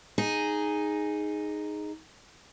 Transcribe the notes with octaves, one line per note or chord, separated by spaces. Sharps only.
D#4 G#4